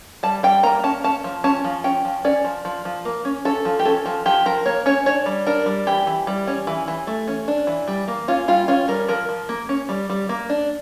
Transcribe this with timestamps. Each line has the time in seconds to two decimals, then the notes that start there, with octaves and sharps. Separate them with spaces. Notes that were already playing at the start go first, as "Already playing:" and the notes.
0.23 G3 A5
0.43 G3 G5
0.63 A#3 A#5
0.84 C#4 A5
1.04 C#4 A5
1.24 F3
1.44 C#4 A5
1.64 F3
1.84 C#4 G5
2.05 F3
2.25 C#4 D5
2.44 F3
2.65 F3
2.85 F3
3.05 A#3
3.25 C#4
3.45 C#4 A4
3.65 F3
3.79 G4
3.85 C#4 A4
4.06 F3
4.26 F3 G4
4.46 F3 A#4
4.66 A#3 C#5
4.86 C#4 C#5
5.06 D4 C#5
5.26 G3
5.47 D4 A#4
5.66 G3
5.87 E3 G4
6.07 E3
6.27 G3
6.47 C#4
6.67 E3
6.88 E3
7.07 A3
7.28 C#4
7.48 D4
7.67 E3
7.88 G3
8.08 A#3
8.28 C#4 F4
8.48 G3 F4
8.68 C#4 F4
8.88 G3 A#4
9.08 F3 A#4
9.29 F3
9.49 A#3
9.69 C#4
9.89 G3
10.10 G3
10.29 A#3
10.49 D4